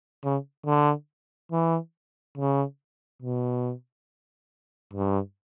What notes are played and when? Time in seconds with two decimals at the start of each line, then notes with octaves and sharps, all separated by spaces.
0.24 C#3
0.66 D3
1.52 E3
2.37 C#3
3.22 B2
4.93 G2